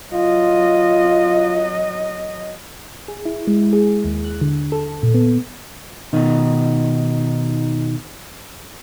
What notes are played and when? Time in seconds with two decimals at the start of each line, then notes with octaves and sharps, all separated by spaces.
0.13 F#3 F4 D#5
3.08 G#4
3.25 E4
3.47 G#3
3.73 G#4
4.04 D#2
4.24 F#6
4.41 D3
4.72 A4
5.03 A#2
5.14 B3
6.13 B2 D#3 D#4